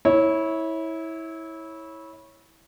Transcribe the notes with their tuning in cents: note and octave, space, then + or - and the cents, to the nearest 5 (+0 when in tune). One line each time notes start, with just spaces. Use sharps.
E4 -20 C#5 -10